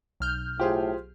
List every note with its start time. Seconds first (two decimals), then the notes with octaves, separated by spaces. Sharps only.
0.20 B1 F6 G6
0.60 A2 F4 G4 G#4 C5